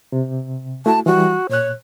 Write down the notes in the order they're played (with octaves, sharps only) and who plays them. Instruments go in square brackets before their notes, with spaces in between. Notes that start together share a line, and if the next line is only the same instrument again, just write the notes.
[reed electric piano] C3
[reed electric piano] A3 E4 F#4 [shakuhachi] A5
[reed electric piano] E3 G3 [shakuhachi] F#4
[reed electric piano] A#2 F#6 [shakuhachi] C#5